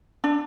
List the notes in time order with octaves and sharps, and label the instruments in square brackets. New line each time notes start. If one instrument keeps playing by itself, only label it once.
[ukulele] D4